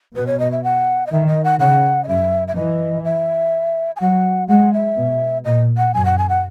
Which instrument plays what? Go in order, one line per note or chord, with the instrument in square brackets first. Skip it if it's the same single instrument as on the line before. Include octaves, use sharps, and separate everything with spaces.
[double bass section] B2 [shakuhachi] B4
[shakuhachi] C#5
D#5
E5
F#5
D#5
[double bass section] D#3 [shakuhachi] E5
[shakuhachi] D#5
F#5
[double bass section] C#3 [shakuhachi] F#5
[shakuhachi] D#5
[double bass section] F#2 [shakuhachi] E5
[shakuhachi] E5
[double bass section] E3 [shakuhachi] D#5
[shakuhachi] E5
G#5
[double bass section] F#3 [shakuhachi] F#5
[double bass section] G#3 [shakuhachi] F#5
[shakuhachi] E5
[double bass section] B2
[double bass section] A#2 [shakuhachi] D#5
[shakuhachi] F#5
[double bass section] F#2 [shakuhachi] G#5
[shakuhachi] F#5
G#5
F#5